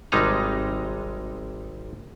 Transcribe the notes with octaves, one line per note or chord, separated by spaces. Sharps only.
G#1 C3 G3 G#3 D#4 A#5